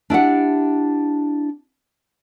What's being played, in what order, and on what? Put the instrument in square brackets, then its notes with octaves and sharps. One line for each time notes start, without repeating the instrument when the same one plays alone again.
[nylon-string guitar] D4 E4 G4 F#5